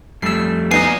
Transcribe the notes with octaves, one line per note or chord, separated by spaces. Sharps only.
F2 G3 A3 E6 C7
A#2 B3 D#4 D#5 G#5 C7